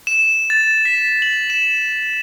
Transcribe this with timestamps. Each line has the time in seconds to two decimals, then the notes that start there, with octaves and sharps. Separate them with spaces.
0.07 E7
0.50 A6
0.85 B6
1.22 F#7
1.50 E7